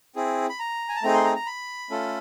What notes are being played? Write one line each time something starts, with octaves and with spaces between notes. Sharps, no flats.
C4 E4 G#4
B5
A#5
G#5
A5
A3 C4 D#4 G#4 A#5
C6
A#5
A#5
B5
A3 C#4 F4 A4